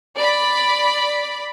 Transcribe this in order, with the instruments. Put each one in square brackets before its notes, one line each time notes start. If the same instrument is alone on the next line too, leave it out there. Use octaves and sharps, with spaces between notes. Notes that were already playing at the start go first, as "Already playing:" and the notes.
[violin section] D5 B5